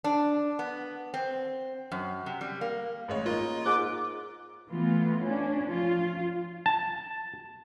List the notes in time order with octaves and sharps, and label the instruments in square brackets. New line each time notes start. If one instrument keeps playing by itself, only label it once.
[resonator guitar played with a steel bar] D4
B3
C4
F#2
C3
G3
A#3
[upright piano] A1 G#3 C#5
[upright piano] A#3 D#4 [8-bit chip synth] F4
[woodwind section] G#2 D6 [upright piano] F#6
[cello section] E3 A3 B3 F4
C#4 D4
F3 F4
[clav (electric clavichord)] A5